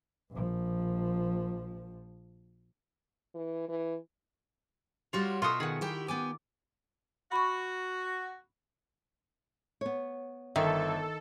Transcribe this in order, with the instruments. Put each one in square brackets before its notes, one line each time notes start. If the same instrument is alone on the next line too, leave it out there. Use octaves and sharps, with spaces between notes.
[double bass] A#1 F3
[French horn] E3
E3
[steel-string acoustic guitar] G3 F#4 C#5 [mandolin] F4
[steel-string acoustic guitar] B2 E5 [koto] F4 F#4 A4 [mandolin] C6 D#6
[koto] D#3 [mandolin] G#4 F#5
[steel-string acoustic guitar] E4 G4 G5
[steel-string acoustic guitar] B3 G5 G#5 [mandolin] D6
[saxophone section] F#4 [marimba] B5 C#6
[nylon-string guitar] B3 C#5
[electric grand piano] G1 E5 [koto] D#3 [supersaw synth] A4